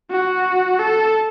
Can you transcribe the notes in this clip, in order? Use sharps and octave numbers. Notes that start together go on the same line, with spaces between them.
F#4
A4